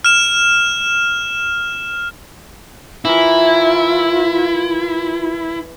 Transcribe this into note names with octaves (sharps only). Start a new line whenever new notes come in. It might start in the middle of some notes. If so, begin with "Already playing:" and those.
F6 E7
E3 E4 F4 A#4